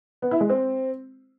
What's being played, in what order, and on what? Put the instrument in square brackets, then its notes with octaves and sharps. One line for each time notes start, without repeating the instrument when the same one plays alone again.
[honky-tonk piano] B3
E4
G#3
C4